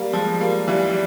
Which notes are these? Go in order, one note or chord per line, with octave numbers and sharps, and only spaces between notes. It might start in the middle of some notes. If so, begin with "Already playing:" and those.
Already playing: G3 A#3
F3 G#3
G3 A#3
E3 G3
G3